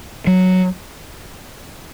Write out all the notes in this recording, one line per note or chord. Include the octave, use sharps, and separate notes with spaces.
F#3